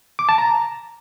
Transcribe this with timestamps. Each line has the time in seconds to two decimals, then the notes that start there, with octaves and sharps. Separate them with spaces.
0.19 D6
0.29 A5
0.38 A#5